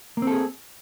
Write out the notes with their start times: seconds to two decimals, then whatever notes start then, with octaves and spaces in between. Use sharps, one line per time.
0.17 A#3
0.22 C4
0.27 A4
0.32 G#4